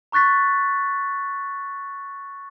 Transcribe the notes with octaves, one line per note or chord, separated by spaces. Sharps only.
A#5 C#6 F#6 A6 B6